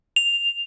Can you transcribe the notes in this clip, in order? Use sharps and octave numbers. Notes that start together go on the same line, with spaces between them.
F7